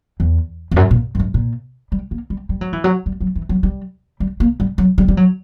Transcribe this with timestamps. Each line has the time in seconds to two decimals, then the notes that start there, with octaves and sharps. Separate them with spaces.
0.20 E2
0.71 E2
0.76 F#2
0.91 A#2
1.15 F#2
1.19 G2
1.34 A#2
1.92 G3
2.11 A#3
2.30 G3
2.49 G3
2.61 F#3
2.73 E3
2.84 F#3
3.06 G3
3.21 F#3
3.35 E3
3.49 F#3
3.63 G3
4.20 G3
4.40 A#3
4.60 G3
4.78 F#3
4.98 G3
5.08 G3
5.17 F#3